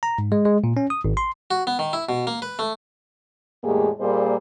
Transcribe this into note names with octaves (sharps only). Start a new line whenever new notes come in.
A#5
G#2
G#3
G#3
A#2
C#4
D#6
G#1
C6
F#4
B3
D#3
E4
B2
A#3
B4
A3
E2 A2 G#3 A#3 G4 G#4
A#2 G3 A#3 G#4 C5 D#5